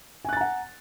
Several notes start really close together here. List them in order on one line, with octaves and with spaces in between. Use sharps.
G#5 F#6 A6 A#5 F#5